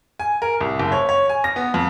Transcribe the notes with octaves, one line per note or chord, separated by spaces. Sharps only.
G#5
A#4
C2
F#1
C#5
C#5
G#5
A#6
B3
F2